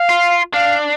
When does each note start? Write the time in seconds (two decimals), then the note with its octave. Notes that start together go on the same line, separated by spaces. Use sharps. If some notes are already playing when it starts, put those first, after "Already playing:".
Already playing: F5
0.09 F4
0.53 D4 F5